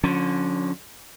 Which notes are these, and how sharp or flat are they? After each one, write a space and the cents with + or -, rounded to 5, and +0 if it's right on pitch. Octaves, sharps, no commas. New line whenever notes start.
D3 +0 F3 +45 C#4 +0